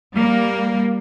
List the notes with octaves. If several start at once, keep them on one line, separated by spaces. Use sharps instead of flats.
G3 A#3